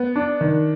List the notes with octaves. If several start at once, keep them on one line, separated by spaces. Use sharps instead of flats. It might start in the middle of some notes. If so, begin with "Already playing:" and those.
Already playing: B3
D4
D#3